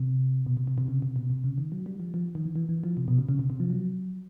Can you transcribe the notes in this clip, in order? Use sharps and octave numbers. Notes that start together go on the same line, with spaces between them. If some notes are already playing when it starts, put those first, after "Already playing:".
Already playing: C3
B2
C3
C3
C3
C#3
C3
B2
C3
C#3
D#3
F#3
G3
F3
F3
D#3
E3
E3
E3
F3
C3
B2
C#3
C#3
C3
C3
F3
F#3